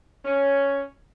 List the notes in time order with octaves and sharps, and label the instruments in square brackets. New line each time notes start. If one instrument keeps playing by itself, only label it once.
[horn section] C#4